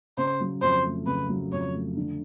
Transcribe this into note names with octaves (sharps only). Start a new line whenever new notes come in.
C#3 C5
F#3
F2 C5
A3
C#3 B4
F#3
F2 C#5
A3
D3